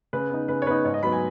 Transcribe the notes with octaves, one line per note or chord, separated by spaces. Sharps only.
C#3 B4
B3 D#4
C#3 B4
C#5
B3 D#4 B4
G#2 C#5
D#5
F#3 B3 D#4 B5
G#5